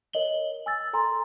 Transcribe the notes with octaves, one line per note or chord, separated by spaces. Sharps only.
A#4 C#5 D#5 F#7 G7
G#5 E6 A6
A4 G#5 A#5 C6